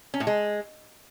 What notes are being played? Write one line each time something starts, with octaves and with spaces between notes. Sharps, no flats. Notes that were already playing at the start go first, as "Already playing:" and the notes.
C#4
A2
G#3